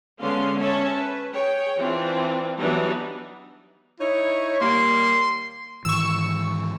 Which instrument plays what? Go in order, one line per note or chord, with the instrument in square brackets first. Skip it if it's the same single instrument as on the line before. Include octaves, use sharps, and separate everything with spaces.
[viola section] D3 G#3 B3 C#4 F5 C6
C#4 C#5 E5 A5
B4
G#4 C#5 G5
E3 C4 D4 F4
E3 F#3 G3 B3 D4 D#4
[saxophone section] D#4 C#5 [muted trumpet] E4
[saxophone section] D#2 G3 A#3 [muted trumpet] C6
[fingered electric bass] G#2 D#3 E3 [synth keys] C#6 E6